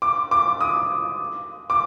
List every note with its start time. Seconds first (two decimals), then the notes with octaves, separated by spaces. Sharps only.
0.02 D6
0.31 D6
0.61 D#6
1.70 D6